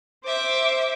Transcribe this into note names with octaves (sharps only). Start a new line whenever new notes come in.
C5 E5 D6